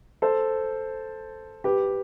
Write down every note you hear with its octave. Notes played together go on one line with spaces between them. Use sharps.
A4 C5
G4 B4